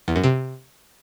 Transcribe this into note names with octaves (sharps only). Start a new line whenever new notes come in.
E2
F#2
C3